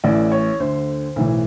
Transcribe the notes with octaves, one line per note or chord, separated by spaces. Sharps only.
A1 A2 E3 D5
C#5
D2 D3 C5
B1 A2 E3